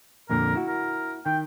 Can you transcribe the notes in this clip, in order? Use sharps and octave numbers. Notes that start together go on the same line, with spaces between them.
F2 A#2 D3 A#4
E4 F#4
A#4
D#3 G5